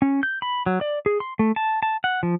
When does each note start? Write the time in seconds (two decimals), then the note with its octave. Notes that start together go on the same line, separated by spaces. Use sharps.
0.02 C#4
0.23 G6
0.42 B5
0.66 F#3
0.81 D5
1.06 G#4
1.20 C6
1.39 A3
1.56 A5
1.83 A5
2.04 F#5
2.23 F3